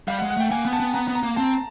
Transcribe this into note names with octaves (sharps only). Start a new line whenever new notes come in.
G3 F5
F#5
G#3
F#5
A3 G5
A#3 G#5
B3
A5
B3
B3 A#5
B3
A#5
A#3
C4 A5